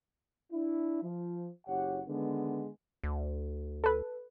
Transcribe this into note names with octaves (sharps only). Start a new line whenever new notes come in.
D4 E4
F3
F#1 G4 C#5 F#5
D3 D#3 G#3 B3
D2
A4 B4